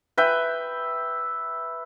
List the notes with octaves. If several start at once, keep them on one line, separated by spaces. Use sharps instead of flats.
B4 E5 G5